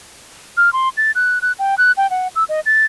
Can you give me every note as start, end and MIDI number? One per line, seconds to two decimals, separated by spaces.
0.57 0.72 89
0.73 0.89 84
0.97 1.11 93
1.15 1.39 90
1.42 1.52 90
1.59 1.75 79
1.78 1.92 90
1.97 2.09 79
2.10 2.28 78
2.36 2.44 88
2.49 2.60 75
2.66 2.85 93